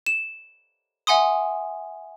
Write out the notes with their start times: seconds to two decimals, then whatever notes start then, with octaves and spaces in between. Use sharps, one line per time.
0.06 E7
1.07 E5 F#5 G#5 C6 D#6